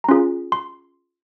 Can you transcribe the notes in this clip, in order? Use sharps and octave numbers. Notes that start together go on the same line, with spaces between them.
A#5
C#4 F4 G#4 C6
C6